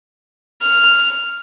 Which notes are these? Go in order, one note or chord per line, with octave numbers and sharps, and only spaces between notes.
F6